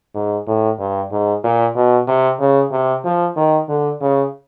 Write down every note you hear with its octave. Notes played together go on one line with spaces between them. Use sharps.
G#2
A2
G2
G#2
A#2
B2
C3
C#3
C3
F3
D#3
D3
C#3